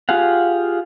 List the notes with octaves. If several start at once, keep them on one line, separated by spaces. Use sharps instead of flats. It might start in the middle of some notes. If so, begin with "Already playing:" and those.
F4 G4 G#4 F5 F#5